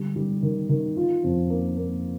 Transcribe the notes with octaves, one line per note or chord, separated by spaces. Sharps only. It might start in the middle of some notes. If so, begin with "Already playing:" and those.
Already playing: D3 G3
G3
D#3
D#3
F4
F2
A#3
A#3